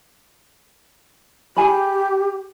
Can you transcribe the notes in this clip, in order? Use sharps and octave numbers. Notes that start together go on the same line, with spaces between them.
G4 G#4 G#5 B5